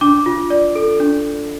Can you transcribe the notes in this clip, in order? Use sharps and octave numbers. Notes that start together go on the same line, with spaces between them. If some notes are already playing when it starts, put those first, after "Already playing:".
D4 D6
F4
D5
A4
D4